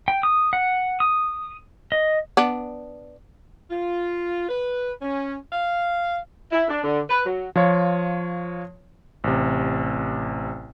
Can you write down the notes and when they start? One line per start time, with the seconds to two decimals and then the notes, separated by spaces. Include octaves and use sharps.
0.08 G5
0.23 D#6
0.53 F#5
1.00 D#6
1.92 D#5
2.37 B3 D4
3.71 F4
4.49 B4
5.02 C#4
5.53 F5
6.51 E4
6.69 D4
6.84 D3
7.10 B4
7.25 F#3
7.56 F3 F4 C#5
9.24 A1 C3